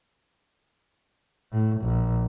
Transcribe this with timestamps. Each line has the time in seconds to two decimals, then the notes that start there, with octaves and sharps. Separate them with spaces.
1.53 A2
1.82 A#1